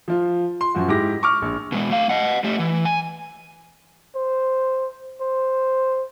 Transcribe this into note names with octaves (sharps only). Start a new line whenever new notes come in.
F3 F4
C6
F#2 F3 F#4
G#2 E4 G4 D6 A#6
C#6 D6 F6
A#1
B2 G#3
A3 F5
D#5 F#5
A3 G4
E3
G#5
C5
C5